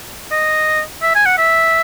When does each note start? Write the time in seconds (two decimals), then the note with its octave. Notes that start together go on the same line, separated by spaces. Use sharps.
0.31 D#5
1.03 E5
1.15 G#5
1.26 F#5
1.38 E5